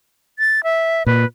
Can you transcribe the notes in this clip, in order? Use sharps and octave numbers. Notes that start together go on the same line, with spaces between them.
A6
E5
A#2 B4